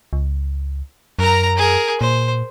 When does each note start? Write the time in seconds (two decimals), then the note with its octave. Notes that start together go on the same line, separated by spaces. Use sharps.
0.13 C#2
1.19 F#2 A#4 A#5
1.57 G#4 A#4
2.01 A#2 C5